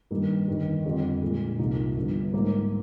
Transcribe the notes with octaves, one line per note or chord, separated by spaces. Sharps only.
G2 D#3 G3 A#3
G1 G2 D#3 G3
F2 D3 G3
A#1 A#2 G#3
C2 C3 F3 A#3 D#4
G1 G2 F3
G#2 G3 A#3